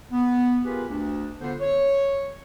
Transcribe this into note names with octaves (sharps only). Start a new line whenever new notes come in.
B3
F4 G4 G#4 A#4 B4
D2 D4
D3 B3 F4 C5
C#5